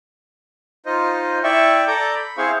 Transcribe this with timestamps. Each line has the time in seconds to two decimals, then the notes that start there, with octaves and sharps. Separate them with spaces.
0.86 D#4 F4 C5 D#5
1.43 E4 D5 E5 G5 C#6
1.88 A4 D5 A#5 D6 G6
2.16 B5
2.38 C4 E4 G#4 C5 F5 C#6